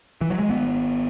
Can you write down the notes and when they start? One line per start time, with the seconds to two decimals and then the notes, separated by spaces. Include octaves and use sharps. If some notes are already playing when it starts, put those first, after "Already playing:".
0.21 E3
0.30 F#3
0.39 G#3
0.49 G#1 B3